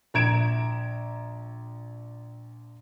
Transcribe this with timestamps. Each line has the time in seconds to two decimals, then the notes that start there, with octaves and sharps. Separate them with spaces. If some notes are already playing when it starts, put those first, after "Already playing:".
0.14 A#1 A#5 G#6 D7 E7